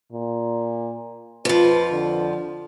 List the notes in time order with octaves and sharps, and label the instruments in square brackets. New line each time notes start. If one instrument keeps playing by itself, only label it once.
[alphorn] A#2
[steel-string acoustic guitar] F2 F3 [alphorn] B4
[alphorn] D3